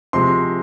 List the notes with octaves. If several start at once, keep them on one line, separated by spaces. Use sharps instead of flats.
C3 F3 G#3 C6